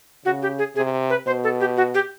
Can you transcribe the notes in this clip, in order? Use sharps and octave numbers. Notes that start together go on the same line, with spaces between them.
C#3 F#4
G4
G#4
C3 G#4
B4
B2 C5
A4
G4
F#4
G4